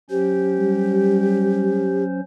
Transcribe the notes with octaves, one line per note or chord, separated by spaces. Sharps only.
F#3 C#4 G4 C5
G3